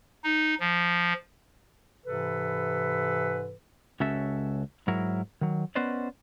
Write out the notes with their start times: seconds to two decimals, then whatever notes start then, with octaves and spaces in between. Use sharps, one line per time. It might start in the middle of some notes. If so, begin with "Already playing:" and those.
0.24 D#4
0.60 F3
2.05 G#2 C3 E3 A4 B4
4.00 C#2 C#4 F#4 A4 E5
4.88 G#2 F#3 E4 A#4
5.41 D#3 F#3
5.75 B3 C#4 B4 C5 D5 D#5